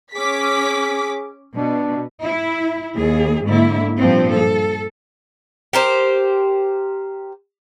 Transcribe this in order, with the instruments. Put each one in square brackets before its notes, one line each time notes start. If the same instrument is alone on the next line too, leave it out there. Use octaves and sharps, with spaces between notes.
[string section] C#4 D6 B6 [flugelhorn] G#4
[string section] B2 [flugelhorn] D4
[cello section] E4
D#2 A#3 G#4
G#2 D3 A#3 E4
G2 A#2 F3 C4
A4
[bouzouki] G4 A#4 C5